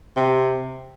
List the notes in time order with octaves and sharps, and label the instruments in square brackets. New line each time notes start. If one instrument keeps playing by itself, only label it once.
[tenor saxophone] C3